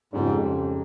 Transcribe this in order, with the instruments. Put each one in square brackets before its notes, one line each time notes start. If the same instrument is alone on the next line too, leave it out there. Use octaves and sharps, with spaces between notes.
[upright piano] F2 C#3 G3 C#4 [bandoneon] G#2